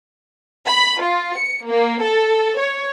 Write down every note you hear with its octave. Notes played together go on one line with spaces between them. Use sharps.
B5
F4
C#7
A#3
A4
C#5